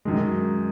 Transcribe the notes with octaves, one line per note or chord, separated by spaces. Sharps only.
F#2 D#3 G#3